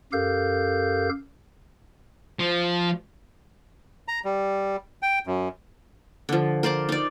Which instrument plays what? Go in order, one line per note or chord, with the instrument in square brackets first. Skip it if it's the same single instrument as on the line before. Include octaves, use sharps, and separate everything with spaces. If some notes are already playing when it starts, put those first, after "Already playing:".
[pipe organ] F#2 G4 A4 A#4 F5 G6
[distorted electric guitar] F3
[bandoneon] A#5
G3
G5
F#2
[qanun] D3 F3
A#4 C5 D5 D6
D#4 D5